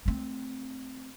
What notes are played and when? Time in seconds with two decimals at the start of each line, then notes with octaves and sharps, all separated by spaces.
0.06 A3 C4